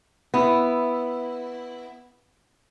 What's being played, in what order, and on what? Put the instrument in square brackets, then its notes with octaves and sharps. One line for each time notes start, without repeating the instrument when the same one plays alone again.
[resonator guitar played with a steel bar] B3 E4